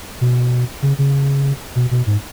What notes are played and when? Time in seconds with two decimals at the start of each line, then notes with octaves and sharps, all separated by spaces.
0.21 B2
0.82 C#3
0.99 C#3
1.76 B2
1.91 B2
2.06 G#2